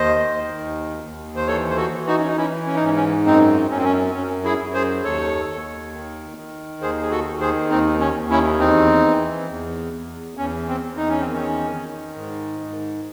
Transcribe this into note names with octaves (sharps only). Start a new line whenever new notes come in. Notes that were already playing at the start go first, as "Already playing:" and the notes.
Already playing: D#2 C5 D#5
D#3
D#2
D#2
C5
E3 A4 C#5
C5
F#4 A4
E3
D#4 F#4
C#4
D#4
E3 C#4 E4
C#4
D#4
G#2 C#4
C#4
F#2 C4 D#4
F#2 C#4
C4
C#4
F#2 C#4
E4 G#4
F#2
G#4 C5
D#2 A4 C#5
D#2
D#3
D#3
D#2 G#4 C5
G#4
F#4 A4
D#3
G#4 C5
D#2 C4 D#4
C#4
D#2
C#4 E4
E2 C4 D#4
E3
E2
E2
E2 C#4
C4
E2
D#4
C#4
C4
D#3
C#4
D#3
G#2
G#2